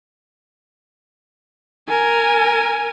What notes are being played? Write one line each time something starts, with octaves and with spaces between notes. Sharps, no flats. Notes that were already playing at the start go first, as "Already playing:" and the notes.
A#4 G#5